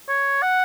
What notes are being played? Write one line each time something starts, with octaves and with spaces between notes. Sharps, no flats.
C#5
F#5